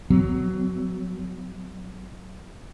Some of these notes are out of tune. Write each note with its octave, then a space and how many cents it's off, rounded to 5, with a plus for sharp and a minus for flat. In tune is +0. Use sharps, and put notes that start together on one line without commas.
F#3 +15 B3 +40